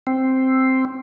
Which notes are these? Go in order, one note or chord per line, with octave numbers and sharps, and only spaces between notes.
C4